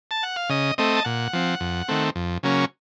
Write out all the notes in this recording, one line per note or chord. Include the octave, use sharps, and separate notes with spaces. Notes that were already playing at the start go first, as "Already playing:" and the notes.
A5
F#5
F5
C#3 D#5
A3 C4 D#5
A5
A#2 F#5
F3 C4
F2
D#3 A3 C4
F2
C#3 F#3 A#3 C#4